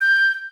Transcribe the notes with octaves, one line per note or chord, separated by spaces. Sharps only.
G6